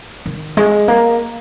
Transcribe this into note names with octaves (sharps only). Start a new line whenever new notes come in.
D#3
G#3
A#3